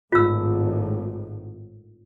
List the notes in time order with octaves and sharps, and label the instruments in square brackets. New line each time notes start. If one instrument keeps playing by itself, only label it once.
[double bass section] G#1 A2 [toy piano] F4 E6